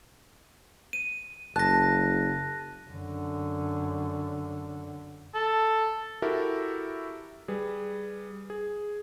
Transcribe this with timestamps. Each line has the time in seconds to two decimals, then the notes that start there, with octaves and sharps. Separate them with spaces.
0.93 D#7
1.56 F#1 A5 F#6 A#6
2.89 F#2 D3
5.35 A4
6.22 E4 F#4 G4 A4 A#4 E5
7.48 G3 G#4 B4
8.50 G#4